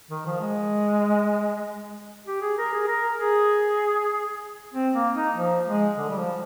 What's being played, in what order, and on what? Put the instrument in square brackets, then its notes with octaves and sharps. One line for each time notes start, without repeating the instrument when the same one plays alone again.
[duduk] D#3
F3
G#3
G4
G#4
A#4
G#4
A#4
G#4
C4
A#3
D#4
F3
G#3
D3
G3
F3